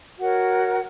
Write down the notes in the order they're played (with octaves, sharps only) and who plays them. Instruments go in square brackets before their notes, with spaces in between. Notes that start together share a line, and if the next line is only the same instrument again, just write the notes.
[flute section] F#4 A#4 C#5 F#5